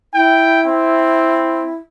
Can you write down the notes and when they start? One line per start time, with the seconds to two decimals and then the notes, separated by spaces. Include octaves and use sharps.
0.14 E4 G5
0.67 C4